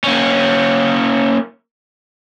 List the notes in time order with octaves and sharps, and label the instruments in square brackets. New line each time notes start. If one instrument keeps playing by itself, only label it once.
[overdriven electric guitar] A#3 C#4